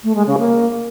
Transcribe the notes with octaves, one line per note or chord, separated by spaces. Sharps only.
A3
G#3
C#3
A#3